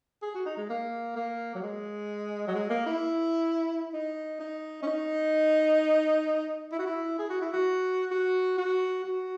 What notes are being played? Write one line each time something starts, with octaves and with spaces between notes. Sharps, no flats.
G#4
F#4
D#4
G#3
A#3
A#3
F#3
G#3
F#3
G#3
A#3
E4
D#4
D#4
C#4
D#4
E4
F#4
E4
G#4
F#4
E4
F#4
F#4
F#4
F#4